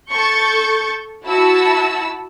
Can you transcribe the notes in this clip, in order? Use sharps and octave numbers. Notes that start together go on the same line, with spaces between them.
A4 C#6 G6 A6
E4 F#4 A5 E6